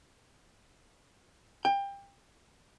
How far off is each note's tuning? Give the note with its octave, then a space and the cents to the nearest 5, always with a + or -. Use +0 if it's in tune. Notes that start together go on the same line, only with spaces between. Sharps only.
G5 +25